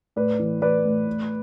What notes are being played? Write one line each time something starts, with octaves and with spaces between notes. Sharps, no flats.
A2 B4 D5
E3
E3 B4 D5
A2
A2